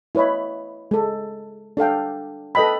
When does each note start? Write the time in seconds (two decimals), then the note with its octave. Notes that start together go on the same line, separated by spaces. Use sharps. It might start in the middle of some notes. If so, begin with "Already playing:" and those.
0.15 E4 B4 C#5 D#5 B5
0.91 G#3 A4
1.77 D4 A4 F5 G5
2.55 A4 B4 D#5 G5 B5